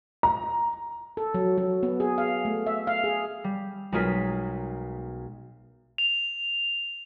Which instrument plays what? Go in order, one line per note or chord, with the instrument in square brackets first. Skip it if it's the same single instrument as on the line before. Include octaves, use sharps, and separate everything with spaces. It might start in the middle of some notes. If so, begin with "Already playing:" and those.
[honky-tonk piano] A#5
[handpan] A4
F#3
F#3
B3
G#4
F5
A3
E5
F5
G#4
[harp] G3
B1 G#3 F4 G#4 A#4 B6
[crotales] F7